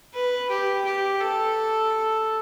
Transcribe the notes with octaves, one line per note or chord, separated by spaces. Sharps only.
B4
G4
G4
A4